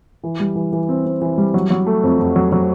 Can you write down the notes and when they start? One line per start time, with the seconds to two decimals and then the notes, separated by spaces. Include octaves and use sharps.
0.24 E3
0.40 G3
0.56 E3
0.73 E3
0.89 C4
1.06 C4
1.22 E3
1.38 G3
1.54 F#3
1.70 F#3
1.86 A3
2.03 F2
2.19 F2
2.36 F#3
2.52 F#3